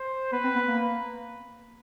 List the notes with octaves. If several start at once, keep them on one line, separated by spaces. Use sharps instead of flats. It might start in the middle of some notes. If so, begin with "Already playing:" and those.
Already playing: C5
B3 B4
C4
B3
A#3